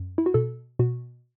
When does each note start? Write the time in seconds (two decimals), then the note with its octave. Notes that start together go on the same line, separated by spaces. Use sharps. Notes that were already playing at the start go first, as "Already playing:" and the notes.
Already playing: F#2
0.18 E4
0.26 F#4
0.34 B2 A4
0.79 B2 F#4